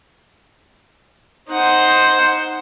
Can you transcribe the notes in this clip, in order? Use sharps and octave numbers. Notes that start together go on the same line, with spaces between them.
D#4 C5 F#5